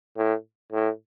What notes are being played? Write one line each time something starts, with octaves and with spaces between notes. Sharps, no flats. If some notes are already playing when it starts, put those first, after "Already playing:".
A2
A2